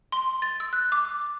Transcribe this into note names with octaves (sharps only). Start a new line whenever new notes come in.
C6
A6
E6
F#6
D6